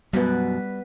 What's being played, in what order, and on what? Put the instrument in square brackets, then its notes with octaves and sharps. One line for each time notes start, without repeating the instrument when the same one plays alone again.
[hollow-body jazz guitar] F#2 B2 [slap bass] G3 [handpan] B3 B4